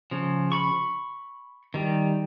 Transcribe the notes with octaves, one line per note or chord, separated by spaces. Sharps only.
C#3 F3
B5 C#6
D#3 G3